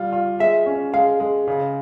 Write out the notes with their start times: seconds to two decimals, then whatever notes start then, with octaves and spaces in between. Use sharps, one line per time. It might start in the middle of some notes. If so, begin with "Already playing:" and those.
Already playing: G3 F4
0.13 F4
0.40 G#3 E5
0.66 C#4
0.94 G#3 F5
1.20 G#3
1.47 C#3